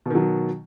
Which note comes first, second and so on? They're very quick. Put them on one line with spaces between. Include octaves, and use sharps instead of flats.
B2 D#3 F#3